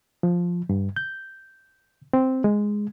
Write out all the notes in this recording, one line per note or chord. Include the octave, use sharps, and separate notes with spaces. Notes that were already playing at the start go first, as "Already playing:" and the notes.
F3
G2
G6
C4
G#3